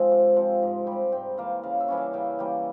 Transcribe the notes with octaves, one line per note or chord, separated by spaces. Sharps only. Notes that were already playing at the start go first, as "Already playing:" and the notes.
Already playing: G#2 F3 G#3 C4 E5
C3
F3 C4
G#2
G3 C4
G#2 G5
E3 A#3 F5
C#3 F5
E5
E3 G3 C#4
F5
C#3 G5
E3 G3 A#3 G5